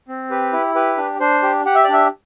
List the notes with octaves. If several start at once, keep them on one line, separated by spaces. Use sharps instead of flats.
C4
G4 B4
E4
G4 B4
D4
D4 C5
G4
G4 F#5
E5
D5
D4 E5